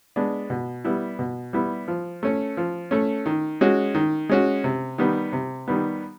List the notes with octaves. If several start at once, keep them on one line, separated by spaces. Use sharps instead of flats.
G#3 B3 D4
B2
G3 B3 E4
B2
G3 B3 E4
F3
A3 C#4
F3
A3 C#4
D#3
G#3 C#4 F#4
D#3
G#3 C#4 F#4
C3
D#3 G3 B3
C3
D#3 G3 B3